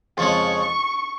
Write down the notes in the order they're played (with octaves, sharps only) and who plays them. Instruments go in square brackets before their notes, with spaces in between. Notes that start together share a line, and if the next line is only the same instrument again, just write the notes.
[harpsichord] F2 C#3 F3 G#3 [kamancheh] C#6